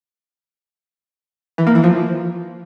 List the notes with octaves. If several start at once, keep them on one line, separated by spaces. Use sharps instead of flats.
E3
A#3
E3
F3